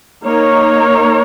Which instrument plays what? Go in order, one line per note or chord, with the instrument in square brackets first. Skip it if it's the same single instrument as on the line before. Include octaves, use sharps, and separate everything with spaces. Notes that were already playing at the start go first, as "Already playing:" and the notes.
[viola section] A#3 D#4 A#4 C#5